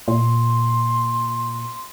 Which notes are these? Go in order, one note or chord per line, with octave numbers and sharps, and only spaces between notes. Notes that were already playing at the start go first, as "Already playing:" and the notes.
A#2 C6